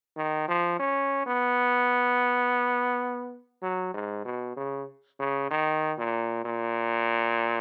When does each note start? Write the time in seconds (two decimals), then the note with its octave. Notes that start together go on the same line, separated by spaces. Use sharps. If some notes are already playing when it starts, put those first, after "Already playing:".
0.17 D#3
0.48 F3
0.79 C#4
1.26 B3
3.62 F#3
3.94 G#2
4.25 B2
4.57 C#3
5.19 C#3
5.51 D#3
5.98 A#2
6.45 A#2